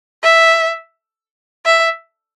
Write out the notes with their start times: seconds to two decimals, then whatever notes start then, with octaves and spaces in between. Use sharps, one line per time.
0.23 E5
1.66 E5